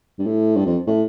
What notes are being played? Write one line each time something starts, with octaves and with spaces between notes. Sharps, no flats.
G2
A2
G2
F2
A2